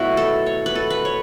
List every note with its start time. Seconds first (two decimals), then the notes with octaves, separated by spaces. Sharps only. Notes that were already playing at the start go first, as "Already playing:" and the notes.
Already playing: B2 F#3 A3 E4 F#4
0.17 A4
0.46 C#5
0.66 B4
0.75 A4
0.90 B4
1.05 C#5